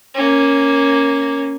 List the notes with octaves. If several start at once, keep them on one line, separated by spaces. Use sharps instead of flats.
A#3 C#4